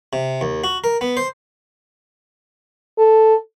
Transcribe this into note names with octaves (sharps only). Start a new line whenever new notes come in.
C3
D#2
F#4
A#4
B3
C5
A4